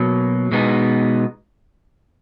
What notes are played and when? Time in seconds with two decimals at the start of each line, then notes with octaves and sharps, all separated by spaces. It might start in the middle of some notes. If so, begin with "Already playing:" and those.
Already playing: B2 F#3 A#3
0.52 B2 G#3 B3 D#4